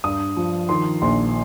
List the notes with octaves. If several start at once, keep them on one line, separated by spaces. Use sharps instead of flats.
G2 D#6
F3
D#3 C6
A#1 C6